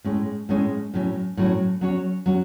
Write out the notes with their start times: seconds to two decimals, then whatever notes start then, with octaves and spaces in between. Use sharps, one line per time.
0.04 A2 G#3 C#4
0.49 A2 G#3 C#4
0.94 A2 F#3 C#4
1.37 A2 F#3 C#4
1.81 F#3 C#4 F#4 C#5
2.26 F#3 C#4 F#4